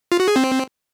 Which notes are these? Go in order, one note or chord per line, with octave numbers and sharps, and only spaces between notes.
F4
F#4
G#4
C4